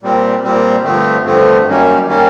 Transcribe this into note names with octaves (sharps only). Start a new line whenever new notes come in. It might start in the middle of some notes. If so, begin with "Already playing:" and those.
A#2 G3 C4
A#2 G3 C4
G2 D3 F3 A3 C4
G2 D3 F3 A3 C4
F#2 D#3 G3 A#3 C#4
D#3 G3 A#3 C#4